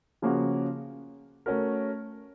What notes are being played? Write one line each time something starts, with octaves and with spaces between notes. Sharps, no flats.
C#3 F3 A#3 C#4 F#4
A3 C#4 F#4 A#4